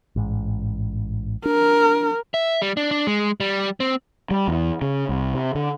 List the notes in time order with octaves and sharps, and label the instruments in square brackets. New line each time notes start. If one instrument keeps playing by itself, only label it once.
[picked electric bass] A1 G#2
[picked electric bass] D4 [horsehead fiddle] A#4
[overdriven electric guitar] E5
G3
D4
D4
G#3
G3
C4
[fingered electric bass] G3
E2
C#3
C2
C3
D3